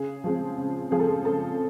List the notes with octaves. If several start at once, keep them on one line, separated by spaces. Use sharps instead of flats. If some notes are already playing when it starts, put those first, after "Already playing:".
Already playing: C#3 G#4
F3 G#3 C4
C#3
F3 G#3 C4 G#4
A4
G#4
C#3 A4